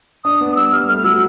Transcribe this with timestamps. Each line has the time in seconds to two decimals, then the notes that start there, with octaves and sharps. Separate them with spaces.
0.25 D4 D#6
0.41 B3
0.52 D#6
0.56 G3 E6
0.73 G3 F6
0.89 A3 F6
1.04 F#3 E6